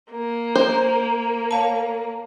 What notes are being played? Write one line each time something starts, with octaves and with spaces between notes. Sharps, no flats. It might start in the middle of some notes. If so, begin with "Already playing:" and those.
A#3
C5
C#5 F5 A5